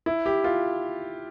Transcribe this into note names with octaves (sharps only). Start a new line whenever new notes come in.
E4
G4
F4